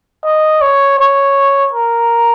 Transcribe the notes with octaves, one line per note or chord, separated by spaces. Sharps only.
D#5
C#5
C#5
A#4